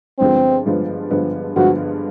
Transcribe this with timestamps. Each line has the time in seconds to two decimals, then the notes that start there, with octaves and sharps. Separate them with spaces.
0.19 G2 D3 F3 G#3 B3 C4
0.66 G2 D3 F3 G#3 B3
1.10 G2 D3 F3 G#3 B3
1.56 G2 D3 F3 G#3 B3 F#4